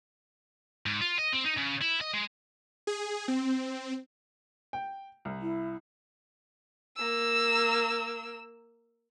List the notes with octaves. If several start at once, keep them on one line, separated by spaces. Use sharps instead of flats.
G#2
F4
D#5
C4
D#4
C#3
E4
D#5
G#3
G#4
C4
G5
C2
E4
A#3 E6